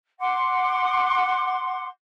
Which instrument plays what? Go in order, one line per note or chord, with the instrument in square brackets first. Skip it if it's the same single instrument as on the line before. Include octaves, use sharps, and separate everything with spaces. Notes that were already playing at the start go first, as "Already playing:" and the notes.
[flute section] F#5 C6 D6